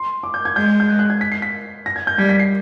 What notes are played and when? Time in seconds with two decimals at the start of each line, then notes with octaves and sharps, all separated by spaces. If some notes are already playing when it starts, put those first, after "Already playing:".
Already playing: C6
0.23 D6
0.34 G6
0.45 G#6
0.56 G#3 G6
0.80 G6
0.89 F#6
0.99 F#6
1.10 G#6
1.21 B6
1.32 C7
1.42 B6
1.86 A#6
1.96 G#6
2.07 G6
2.18 G3 G#6
2.29 B6
2.39 C7